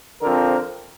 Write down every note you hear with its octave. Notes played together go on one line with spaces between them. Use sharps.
D3 F3 C4 A#4